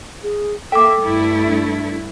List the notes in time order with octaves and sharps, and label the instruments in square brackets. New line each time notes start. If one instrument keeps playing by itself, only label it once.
[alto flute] G#4
[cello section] A#3 E5 [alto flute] A4 [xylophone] G5 D6
[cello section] G2 A3 E4
[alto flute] D4